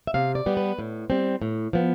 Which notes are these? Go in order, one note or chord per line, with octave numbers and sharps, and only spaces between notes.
E5
C3 F5
D5
G3 B3
B4
A2
G3 C4
A2
F3 B3